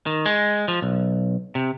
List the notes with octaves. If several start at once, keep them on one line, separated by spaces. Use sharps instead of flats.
D#3
G#3
F3
B1
C3